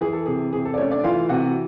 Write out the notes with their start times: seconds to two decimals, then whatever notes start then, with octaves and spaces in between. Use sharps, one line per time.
0.01 E3 G#4
0.13 A4
0.26 C3 G#4
0.53 C3 G#4
0.65 A4
0.74 D5
0.78 A3 C#4 C#5
0.91 D4 D5
1.04 E3 F4 F5
1.29 C3 F#4 F#5